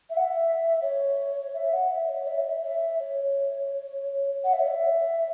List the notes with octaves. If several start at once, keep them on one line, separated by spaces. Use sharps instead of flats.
E5
F#5
E5
C#5
E5
F#5
E5
C#5
E5
C#5
E5
E5
C#5
F#5
E5
C#5
E5